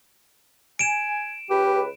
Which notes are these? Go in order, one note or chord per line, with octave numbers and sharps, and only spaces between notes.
G#5 D7 E7
C#2 G4 B4